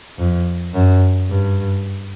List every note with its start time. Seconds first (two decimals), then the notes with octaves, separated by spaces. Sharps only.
0.19 F2
0.74 F#2
1.29 G2